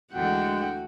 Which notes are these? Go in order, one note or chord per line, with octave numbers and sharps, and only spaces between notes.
D2 D3 E3 G#3 A3 F#4 F#5 G5